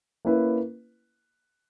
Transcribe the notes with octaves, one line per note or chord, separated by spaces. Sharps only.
A#3 C#4 E4 B4